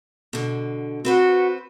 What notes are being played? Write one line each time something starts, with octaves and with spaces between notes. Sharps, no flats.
B2 D3
C4 F#4 B4 C5